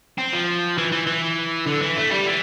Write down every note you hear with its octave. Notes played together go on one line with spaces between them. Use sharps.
C4
F3
E3
E3
E3
D3
E3
A3
G3
E3